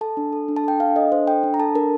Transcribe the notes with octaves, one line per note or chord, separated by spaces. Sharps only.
A4 A5
D4
A4
D4
A5
A4 G5
D4 F5
A4 D#5
D4 C5
A4 G5
D4
A#5
A4 A5
D4 A#4